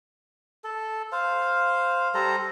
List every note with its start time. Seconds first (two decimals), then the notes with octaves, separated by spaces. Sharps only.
0.64 A4
1.12 C5 F5
2.14 G3 A4 C5 A#5